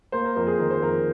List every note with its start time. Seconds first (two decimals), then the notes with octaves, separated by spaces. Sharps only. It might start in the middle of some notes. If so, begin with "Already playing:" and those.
0.12 A#3 C5
0.24 A#4
0.36 F2 A#4
0.47 G#4
0.59 D#3 A#4
0.71 C5
0.82 F2 A#4